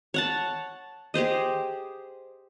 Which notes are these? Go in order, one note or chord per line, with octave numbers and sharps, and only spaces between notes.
C#5 F#5 A5
G4 G#4 C5 D#5